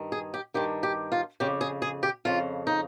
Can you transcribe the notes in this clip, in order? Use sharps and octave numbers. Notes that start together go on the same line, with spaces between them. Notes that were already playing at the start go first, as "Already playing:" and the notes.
Already playing: G2 D#3
G#4
G4
G2 D#3 G4
G4
F4
F2 C#3 G4
G#4
G#4
G4
F2 C#3 F4
D#4